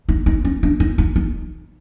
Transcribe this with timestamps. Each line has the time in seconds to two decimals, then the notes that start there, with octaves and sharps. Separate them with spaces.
0.09 D#4
0.26 D#4
0.45 C#4
0.63 D4
0.80 D#4
0.98 D#4
1.16 D#4